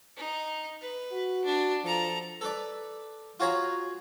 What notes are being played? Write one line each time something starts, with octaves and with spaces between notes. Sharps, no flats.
D#4
B4
F#4
D4
F3 A4 A#5
A4 B4 D5
F4 F#4 G#4 C#5 A#5 B5